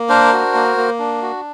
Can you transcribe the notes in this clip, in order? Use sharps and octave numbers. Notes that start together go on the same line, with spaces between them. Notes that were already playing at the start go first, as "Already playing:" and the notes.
Already playing: A#3
D4 A#4 C5
F#4
A#3
A#3
D4
F#4